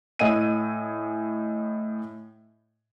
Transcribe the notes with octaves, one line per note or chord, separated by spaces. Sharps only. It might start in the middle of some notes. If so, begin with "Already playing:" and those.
A2 D#5 E5 G#5 D#7